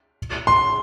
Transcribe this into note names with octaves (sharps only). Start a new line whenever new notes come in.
C6